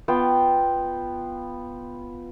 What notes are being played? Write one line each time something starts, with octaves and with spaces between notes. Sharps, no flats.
B3 F4 G5